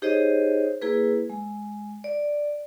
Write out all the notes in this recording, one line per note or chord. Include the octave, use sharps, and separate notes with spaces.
D#4 G4 G#4 C5 C#5 D#5
A#3 E4 G#4 B4
G#3
D5